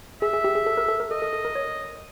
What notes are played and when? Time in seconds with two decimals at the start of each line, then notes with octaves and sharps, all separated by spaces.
0.22 G#4 E5
0.33 G#4
0.44 G4
0.55 G#4
0.66 A4
0.77 A#4
0.88 A4
1.00 A#4
1.11 A4 D#5
1.22 A4
1.33 A4
1.45 A#4
1.55 C#5